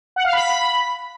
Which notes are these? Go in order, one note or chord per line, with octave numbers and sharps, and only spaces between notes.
F#5
F5
B5